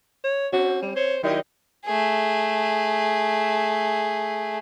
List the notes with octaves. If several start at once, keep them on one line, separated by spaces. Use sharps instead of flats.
C#5
C4 F#4
G3
C5 C#5
D#3 F#3 E4 G4 D#5
A3 G#4